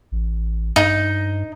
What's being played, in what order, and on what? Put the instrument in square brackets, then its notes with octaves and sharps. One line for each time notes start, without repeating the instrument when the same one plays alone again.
[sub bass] A1
[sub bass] G2 [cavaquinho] D#4